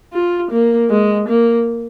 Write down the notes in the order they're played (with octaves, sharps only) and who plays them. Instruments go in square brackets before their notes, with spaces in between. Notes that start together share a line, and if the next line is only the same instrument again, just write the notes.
[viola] F4
A#3
G#3
A#3